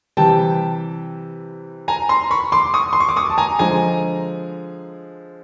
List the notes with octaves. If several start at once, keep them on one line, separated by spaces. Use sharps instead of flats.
C3 E3 G3 G5 A5
G#5 A#5
A#5 C6
B5 C#6
C6 D6
C#6 D#6
C6
C#6
D6
C#6 D#6
A5
G#5 A#5
D3 F3 G#3 G#5 A#5